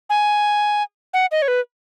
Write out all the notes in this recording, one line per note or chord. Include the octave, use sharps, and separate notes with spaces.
G#5
F#5
D#5
C#5
B4